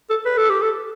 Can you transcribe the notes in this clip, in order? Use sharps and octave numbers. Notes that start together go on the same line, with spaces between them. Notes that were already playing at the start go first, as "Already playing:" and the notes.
A4
B4
A4
G4
A4